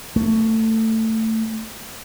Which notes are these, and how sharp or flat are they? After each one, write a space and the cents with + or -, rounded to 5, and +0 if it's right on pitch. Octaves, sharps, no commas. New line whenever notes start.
A3 +20